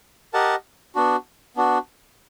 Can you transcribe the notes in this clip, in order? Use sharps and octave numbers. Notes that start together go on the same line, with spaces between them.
G4 A#4 D#5 F#5 A5
B3 D4 F#4
B3 D4 F#4